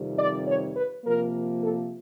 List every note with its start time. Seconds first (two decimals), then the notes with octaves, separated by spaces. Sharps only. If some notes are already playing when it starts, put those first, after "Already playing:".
Already playing: F2 C3 D#3 G3
0.18 D5
0.46 C#5
0.75 B4
1.03 C3 F3 A#3 A#4
1.61 A4